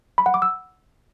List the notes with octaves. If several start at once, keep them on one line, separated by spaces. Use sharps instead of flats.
B5
F#5
D6
E6